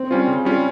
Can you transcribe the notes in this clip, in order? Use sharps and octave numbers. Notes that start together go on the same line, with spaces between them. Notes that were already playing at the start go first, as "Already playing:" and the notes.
Already playing: C4
G3 C#4 F4
C#3
G3 C#4 F4